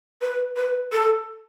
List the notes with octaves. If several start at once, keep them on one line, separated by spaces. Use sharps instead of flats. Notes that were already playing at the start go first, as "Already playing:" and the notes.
B4
B4
A4